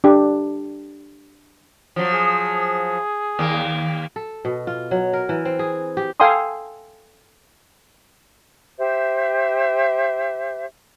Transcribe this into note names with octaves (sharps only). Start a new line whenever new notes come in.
D4 G4
F3 F#3
G#4
D#2 A#3
A4
B2
F4
F#3
A#4
E3
C4
G#4
G4
A4 F5 G5 G#5 C6 D#6
G4 C5 E5